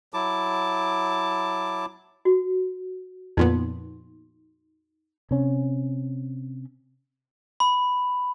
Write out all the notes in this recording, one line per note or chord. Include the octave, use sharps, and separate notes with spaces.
F#3 E4 A5 D6
F#4
F2 A#2 B3 D#4 C6
C3 C#4
B5